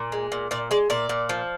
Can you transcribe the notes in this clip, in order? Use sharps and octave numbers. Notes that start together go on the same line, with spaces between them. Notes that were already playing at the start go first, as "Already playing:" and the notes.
Already playing: A#2
G#3
A#2
A#2 D5
G#3 D5
A#2 D5
A#2
F3